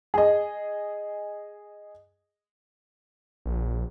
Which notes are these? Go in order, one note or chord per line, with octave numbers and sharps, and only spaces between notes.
G#4 D#5
A#1